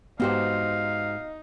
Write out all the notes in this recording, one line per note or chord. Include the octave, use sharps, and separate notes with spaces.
G#2 B3 D#4 F#4 G4 C5 F5